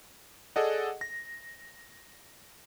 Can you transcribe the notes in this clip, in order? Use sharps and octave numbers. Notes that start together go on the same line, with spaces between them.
G#4 A4 D5 D#5 F#5
A#6